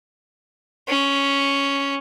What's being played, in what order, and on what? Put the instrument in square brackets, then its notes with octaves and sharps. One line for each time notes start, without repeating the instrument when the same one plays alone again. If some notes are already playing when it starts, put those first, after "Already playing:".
[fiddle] C#4